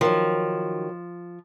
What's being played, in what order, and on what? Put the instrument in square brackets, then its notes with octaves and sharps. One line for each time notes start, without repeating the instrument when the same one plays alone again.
[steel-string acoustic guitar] D#3 F#3 [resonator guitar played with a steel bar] F3